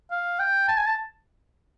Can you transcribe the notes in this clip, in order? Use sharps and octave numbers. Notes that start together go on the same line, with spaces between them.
F5
G5
A5
G#5
A5